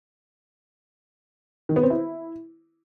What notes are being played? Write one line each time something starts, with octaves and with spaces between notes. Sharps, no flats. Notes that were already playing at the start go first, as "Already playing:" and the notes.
D#3
B3
C4
E4